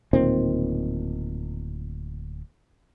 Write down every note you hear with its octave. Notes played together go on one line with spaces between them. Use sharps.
D1 A#2 D#3 C4